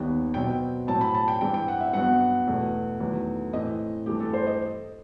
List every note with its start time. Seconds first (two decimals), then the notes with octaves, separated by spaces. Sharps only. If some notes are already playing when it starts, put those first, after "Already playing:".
Already playing: D#2 D#3 G3 B3
0.34 B2 F#3 C4 G5
0.87 A2 F#3 C4 A5
1.01 B5
1.14 A5
1.28 G5
1.41 G2 E3 G3 C4 G5
1.54 G5
1.68 F#5
1.80 E5
1.93 G2 F#3 B3 F#5
2.47 E2 B2 A3
3.00 E2 D#3 F#3 A3
3.53 A2 E3 A3 C4 D#5
4.06 G2 E3 A3 G4
4.20 A4
4.34 C5
4.47 D#5